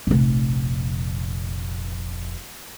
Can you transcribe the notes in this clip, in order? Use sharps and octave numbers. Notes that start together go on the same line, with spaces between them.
F1 A#1